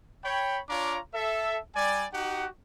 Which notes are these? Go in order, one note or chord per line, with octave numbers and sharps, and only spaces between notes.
C#5 G5 B5
D4 F4 C#5 F5 A#5 D6
A4 E5
G3 D5 G#5
D#4 F#4 G4 F#5